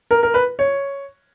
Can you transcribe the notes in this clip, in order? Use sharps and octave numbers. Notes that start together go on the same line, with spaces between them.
A#4
A#4
B4
C#5